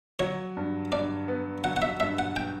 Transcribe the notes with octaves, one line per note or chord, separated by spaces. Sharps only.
F#3 C#5
G2
G2 D5
B3
F#3 F#5
F#5
E5
G2 E5
F#5
G5